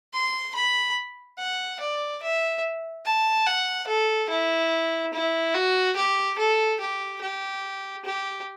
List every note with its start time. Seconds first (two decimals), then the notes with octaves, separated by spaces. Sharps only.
0.13 C6
0.54 B5
1.38 F#5
1.80 D5
2.22 E5
3.05 A5
3.46 F#5
3.87 A4
4.30 E4
5.13 E4
5.54 F#4
5.96 G4
6.38 A4
6.80 G4
7.21 G4
8.04 G4